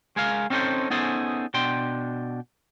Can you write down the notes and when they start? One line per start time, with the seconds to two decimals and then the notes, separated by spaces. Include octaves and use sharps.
0.16 G#3 G#4 A#4 F5
0.50 C4 C#4 D#4 F4 A4 C5
0.90 B3 C#4 D#4 G#4 A4 C5
1.54 B2 D4 G5 C6